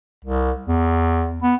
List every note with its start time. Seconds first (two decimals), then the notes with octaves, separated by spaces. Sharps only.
0.25 C2
0.67 E2
1.43 B3